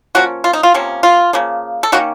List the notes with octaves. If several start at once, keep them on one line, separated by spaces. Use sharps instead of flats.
F3 A#3 C#4 F#4
F4
D#4
F4
C3 F3 A#3 C#4
F4
C#3 F3 A#3
A4
D#3 A#3 C#4 F#4